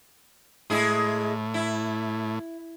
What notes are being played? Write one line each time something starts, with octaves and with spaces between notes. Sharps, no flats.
A2 G#3 E4 G#4
E4